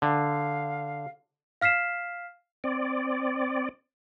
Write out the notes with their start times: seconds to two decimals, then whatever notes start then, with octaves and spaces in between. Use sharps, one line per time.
0.02 D3 F5
1.61 F5 F6 B6 C7 E7
2.64 C4 D5